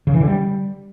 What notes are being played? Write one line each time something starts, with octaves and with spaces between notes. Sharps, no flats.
C#3
E3
D3
G3